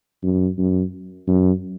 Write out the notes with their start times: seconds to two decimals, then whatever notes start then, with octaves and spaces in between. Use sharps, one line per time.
0.23 F#2
0.58 F#2
1.27 F#2